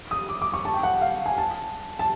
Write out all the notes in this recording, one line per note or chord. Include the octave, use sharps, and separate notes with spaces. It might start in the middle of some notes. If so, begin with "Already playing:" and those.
D#6
D6
D6
C#6
A5
G5
F#5
F5
G#5
A5
A5